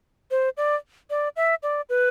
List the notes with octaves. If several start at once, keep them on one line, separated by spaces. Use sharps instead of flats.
C5
D5
D5
E5
D5
B4